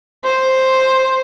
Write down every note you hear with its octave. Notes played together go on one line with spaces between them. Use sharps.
C5